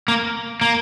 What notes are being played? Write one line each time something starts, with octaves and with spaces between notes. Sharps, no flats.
A#3
A#3